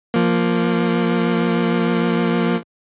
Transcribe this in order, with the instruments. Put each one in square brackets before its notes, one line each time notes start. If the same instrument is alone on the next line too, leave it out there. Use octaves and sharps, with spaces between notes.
[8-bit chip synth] F3 A#3